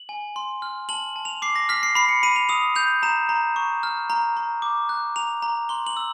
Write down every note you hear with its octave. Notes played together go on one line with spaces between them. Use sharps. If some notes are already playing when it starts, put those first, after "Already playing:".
Already playing: F#7
G#5
C6
F6
A5 F#7
A5
F7
D6 C7
A#6
F6 B6
C7
B5 C7
C#7
B5 D#7
F7
D#6 F7
G6 F7
A#5 E7
A#5
C#6
F6
A#5
A#5
D6
F#6
A#5 F7
A#5
C6 G7
F#7
E6